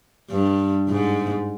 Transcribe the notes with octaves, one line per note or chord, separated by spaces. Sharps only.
G2
G#2